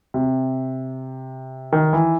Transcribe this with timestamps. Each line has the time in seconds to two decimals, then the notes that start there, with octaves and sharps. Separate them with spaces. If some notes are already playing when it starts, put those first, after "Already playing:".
0.14 C3
1.73 D#3
1.93 E3